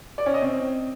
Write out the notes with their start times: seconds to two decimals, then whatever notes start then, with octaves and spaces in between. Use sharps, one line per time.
0.18 D5
0.26 C#4
0.34 D#5
0.42 C4